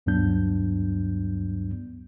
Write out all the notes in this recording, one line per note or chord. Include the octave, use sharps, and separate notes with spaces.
D2 G2 F#3 B3 D4 G6